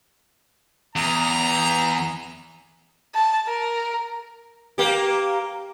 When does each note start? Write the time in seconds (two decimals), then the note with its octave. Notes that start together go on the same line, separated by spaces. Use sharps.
0.96 E2 A#5
3.15 A5
3.47 A#4
4.78 A#3 G4